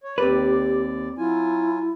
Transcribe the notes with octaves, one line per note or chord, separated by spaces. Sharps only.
C#5
D#2 C4 G4 B4 D5
F#3 E4 F4 G#5